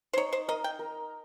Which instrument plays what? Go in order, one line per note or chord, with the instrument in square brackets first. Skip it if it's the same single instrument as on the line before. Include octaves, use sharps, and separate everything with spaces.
[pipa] C5
[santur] D#4 [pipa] C#5
[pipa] C5
[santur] A#4 [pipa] D#5
[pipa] G5
[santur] A#4